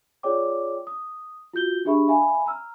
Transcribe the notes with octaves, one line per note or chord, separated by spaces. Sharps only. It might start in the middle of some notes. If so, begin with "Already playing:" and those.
F4 G#4 C#5 D5 G5 D6
D#6
F4 F#4 G6 G7
D4 G4 G#4 E5 B5 C#6
E5 F5 G#5 B5
A#5 E6 F6